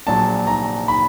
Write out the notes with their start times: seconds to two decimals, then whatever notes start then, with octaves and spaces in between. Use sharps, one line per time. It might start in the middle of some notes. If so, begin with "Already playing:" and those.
0.07 A#1 A#2 F#3 A5
0.47 A#5
0.88 B5